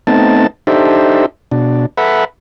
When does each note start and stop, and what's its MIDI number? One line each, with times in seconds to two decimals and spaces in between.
0.07 0.47 57
0.07 0.47 59
0.07 0.47 60
0.07 0.47 63
0.07 0.47 81
0.67 1.26 62
0.67 1.26 63
0.67 1.26 67
0.67 1.26 69
0.67 1.26 72
0.67 1.26 76
1.51 1.86 47
1.51 1.86 62
1.98 2.24 69
1.98 2.24 71
1.98 2.24 76
1.98 2.24 78
1.98 2.24 83